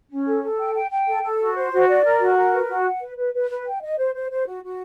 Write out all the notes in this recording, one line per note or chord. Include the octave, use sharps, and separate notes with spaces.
C#4
A4
A4
G5
G5
G5
A4
A4
F#4
C5
F#4
D5
A#4
F#4
A#4
B4
F#4
F#5
B4
B4
B4
B4
G5
D#5
C5
C5
C5
F#4
F#4